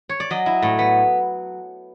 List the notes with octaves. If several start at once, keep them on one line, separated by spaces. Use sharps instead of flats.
C#5
D5
F#3 D#5
E4
A2
B3